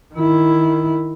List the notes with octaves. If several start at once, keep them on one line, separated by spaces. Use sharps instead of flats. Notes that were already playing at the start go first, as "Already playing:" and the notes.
D#3 E4